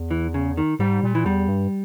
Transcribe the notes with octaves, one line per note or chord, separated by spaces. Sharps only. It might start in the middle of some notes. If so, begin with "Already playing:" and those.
Already playing: E2
E3
C#3
D#3
G#2 G3
A#2
E3
E2 G3
G2